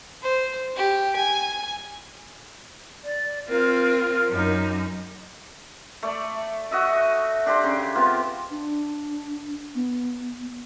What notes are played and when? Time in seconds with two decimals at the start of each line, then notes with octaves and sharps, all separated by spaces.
0.22 C5
0.77 G4
1.16 G#5
3.04 D5
3.48 C4 F4 A#4
4.29 F#2 D#4
6.03 A3 D5
6.71 F#4 D#5 E5
7.46 D4 G4 C5
7.63 C#3
7.95 B3 C4 F4
8.51 D4
9.75 B3